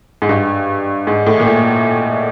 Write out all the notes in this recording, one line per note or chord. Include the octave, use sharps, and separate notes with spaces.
G#2
G2
G#2
A2
A#2
A2